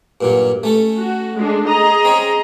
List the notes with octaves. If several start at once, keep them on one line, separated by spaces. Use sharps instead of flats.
G2 A#2 F#3
A3 C#4 A4
F#4
G#3 D4
G#4 D#5 A#5
C4 C#4 C#5